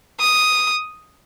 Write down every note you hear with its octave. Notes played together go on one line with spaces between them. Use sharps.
D#6